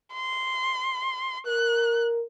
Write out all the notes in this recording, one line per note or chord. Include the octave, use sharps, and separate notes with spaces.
C6
A#4 F#6